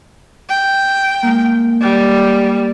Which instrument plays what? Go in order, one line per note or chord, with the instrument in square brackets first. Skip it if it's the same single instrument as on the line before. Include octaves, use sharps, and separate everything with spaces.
[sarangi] G5
[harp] G#3 A#3
[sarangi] G3